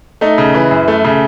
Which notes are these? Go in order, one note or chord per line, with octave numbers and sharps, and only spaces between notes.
A3 D#4
C#3
E3
F#2
A3
C#3